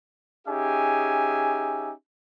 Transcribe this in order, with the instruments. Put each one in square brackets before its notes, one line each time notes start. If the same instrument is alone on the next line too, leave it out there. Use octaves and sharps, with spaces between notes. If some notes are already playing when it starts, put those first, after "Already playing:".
[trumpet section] C#4 D#4 G4 G#4 E5 G#5